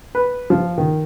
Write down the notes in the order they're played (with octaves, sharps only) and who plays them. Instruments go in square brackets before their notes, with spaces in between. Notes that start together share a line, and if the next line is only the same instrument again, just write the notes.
[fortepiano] B4
F3
D#3